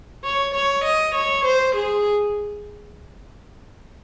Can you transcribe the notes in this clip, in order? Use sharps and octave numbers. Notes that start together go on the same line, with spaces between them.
C#5
C#5
D#5
C#5
C5
G#4